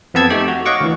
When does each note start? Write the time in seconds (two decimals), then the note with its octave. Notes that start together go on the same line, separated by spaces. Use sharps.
0.14 F2 B3 C4 A5 E6 G#6
0.30 A3 D#4 G4 G5
0.48 F#4
0.66 C#5 D#5 F5 F#5 C#6 D6
0.80 D2 E3